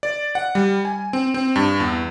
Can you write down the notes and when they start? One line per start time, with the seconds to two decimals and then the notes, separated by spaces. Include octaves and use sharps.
0.03 D5
0.35 F#5
0.55 G3
0.85 G#5
1.13 C4
1.34 C4
1.56 G2
1.80 E2